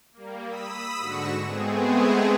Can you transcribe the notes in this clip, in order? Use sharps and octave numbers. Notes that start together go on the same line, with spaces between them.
G3 A#3
B5 D#6 E6 B6
G#2 D3 F#4 A#6 C#7 E7
G#3 A3 B3 C4 G#4